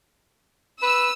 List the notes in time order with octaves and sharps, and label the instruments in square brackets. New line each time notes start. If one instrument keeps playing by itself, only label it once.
[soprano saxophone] B4 [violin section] E6